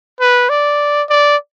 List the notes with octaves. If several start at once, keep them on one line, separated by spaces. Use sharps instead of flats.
B4
D5
D5